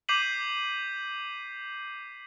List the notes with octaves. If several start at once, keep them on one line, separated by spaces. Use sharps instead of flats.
D6 G6 B6 C7 D#7 F#7